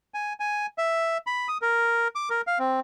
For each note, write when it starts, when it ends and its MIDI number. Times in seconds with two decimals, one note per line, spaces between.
0.14 0.33 80
0.40 0.66 80
0.78 1.18 76
1.27 1.48 83
1.48 1.58 87
1.62 2.08 70
2.15 2.29 86
2.30 2.41 70
2.47 2.58 77
2.59 2.80 60